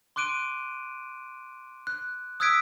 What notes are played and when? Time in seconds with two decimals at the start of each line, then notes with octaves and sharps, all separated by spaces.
0.16 C6 D6 F#6 D7 D#7
1.87 F#6
2.40 D#6 E6 F#6 G#6 B6 D7